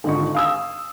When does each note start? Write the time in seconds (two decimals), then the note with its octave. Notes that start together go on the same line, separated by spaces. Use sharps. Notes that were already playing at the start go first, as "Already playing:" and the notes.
0.04 G#1 D3 D#4 F4 C#6
0.34 F5 D#6 E6